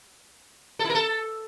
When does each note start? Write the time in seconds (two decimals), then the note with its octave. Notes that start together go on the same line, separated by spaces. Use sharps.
0.79 A4
0.85 E4
0.90 A#4
0.95 A4